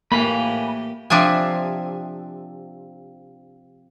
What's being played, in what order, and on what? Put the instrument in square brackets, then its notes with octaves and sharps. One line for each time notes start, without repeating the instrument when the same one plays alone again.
[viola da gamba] A2 E3 G4 [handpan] A#3 [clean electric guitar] G#5 B5
[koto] C3 F3 D4 E5 G#5